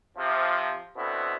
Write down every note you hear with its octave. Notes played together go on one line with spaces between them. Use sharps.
C3 F3
B2 D3 B3 C4 E4